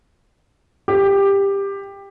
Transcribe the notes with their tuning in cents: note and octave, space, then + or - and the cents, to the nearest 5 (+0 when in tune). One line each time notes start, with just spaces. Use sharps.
G4 +15